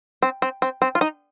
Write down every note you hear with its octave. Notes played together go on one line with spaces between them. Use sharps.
C4
C4
C4
C4
F4
D#4